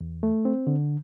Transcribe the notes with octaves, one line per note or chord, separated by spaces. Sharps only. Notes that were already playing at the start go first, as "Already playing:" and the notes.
E2
A3
C4
D3